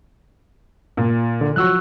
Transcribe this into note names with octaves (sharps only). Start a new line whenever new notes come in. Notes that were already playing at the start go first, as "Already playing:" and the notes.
A#2
D3
F3 F#3 F#4 C#6 E6 F#6